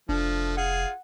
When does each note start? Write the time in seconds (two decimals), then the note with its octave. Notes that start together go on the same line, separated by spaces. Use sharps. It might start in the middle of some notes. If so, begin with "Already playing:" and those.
0.09 F1 F3 A3 D4
0.57 F4 G#4 F#5